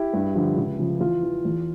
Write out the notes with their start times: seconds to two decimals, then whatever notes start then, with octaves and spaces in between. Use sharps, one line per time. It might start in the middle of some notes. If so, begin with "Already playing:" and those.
Already playing: E4 G4
0.13 G2
0.35 D3 F3
0.57 C#2
0.79 C#3 F3
1.00 E2 F4
1.23 E3
1.45 E2